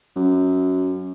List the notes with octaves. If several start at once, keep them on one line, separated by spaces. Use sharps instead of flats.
F#2